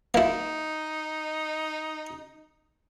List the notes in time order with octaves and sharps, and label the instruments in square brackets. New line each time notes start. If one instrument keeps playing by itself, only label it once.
[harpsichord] A#3 E4 [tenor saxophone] D#4